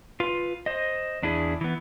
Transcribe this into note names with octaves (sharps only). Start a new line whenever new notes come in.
F4 B4
C5 D#5
E2 D4 E4 G#4
E3 B3